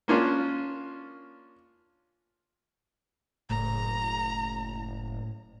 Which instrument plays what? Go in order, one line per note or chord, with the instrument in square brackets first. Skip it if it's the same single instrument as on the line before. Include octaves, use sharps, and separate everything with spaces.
[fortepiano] A#3 C#4 D4 F4
[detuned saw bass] F#1 [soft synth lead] A2 [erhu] A#5